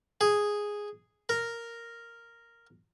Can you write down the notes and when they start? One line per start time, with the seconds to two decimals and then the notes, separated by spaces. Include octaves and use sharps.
0.21 G#4
1.29 A#4